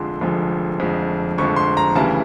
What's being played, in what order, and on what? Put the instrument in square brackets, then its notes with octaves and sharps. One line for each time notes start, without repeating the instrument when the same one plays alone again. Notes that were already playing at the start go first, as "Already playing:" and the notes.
Already playing: [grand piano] F1 F2 D3 F3 G#3 C6
F1 F2 D3 F3 G#3
F1 F2 D3 F3 G#3
F1 F2 D3 F3 G#3 C#6
C6
A#5
D2 C#3 E3 G3 A5